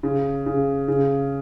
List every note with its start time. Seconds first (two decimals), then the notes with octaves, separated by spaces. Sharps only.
0.03 C#3
0.46 C#3
0.88 C#3